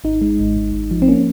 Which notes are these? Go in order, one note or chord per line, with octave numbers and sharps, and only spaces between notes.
G#1 D#4
G#3
G#1
G#1
G#1
F3
C4
A#3 C#4